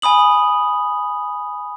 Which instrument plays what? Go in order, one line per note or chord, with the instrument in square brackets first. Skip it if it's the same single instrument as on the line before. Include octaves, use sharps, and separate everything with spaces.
[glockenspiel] G#5 B5 D#6 F#7